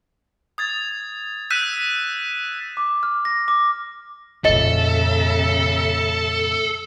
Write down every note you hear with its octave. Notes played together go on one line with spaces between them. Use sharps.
D#6 G#6 A6
E6 F#6 G6 B6 D#7 E7
D6
F6
A#6
D6
F2 A#2 C#3 A4 D#5 E5